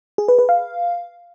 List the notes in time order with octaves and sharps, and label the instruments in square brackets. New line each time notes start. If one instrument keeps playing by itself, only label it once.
[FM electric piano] G#4
B4
B4
F5